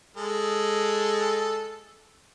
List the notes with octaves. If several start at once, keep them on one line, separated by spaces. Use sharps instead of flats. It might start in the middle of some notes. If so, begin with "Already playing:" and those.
G#3 A4